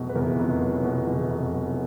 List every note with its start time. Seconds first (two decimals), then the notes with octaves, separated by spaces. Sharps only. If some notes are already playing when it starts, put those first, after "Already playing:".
Already playing: F1 E2 B2 F#3
0.09 B4
0.15 E2 A#4
0.39 F1
0.61 F#3
0.84 B2
1.07 E2
1.30 F1
1.52 F#3